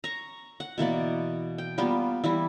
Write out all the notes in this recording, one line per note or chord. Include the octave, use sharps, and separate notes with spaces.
A#5 C#6
F#5
B2 E3 A#3 D5
G5
G3 A#3 B3 F4
E3 G3 E4